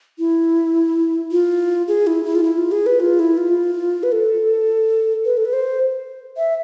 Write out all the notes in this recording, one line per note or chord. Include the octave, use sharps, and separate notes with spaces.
E4
F4
G#4
E4
E4
F4
E4
F4
G#4
B4
F4
E4
F4
B4
A4
B4
A4
B4
C5
E5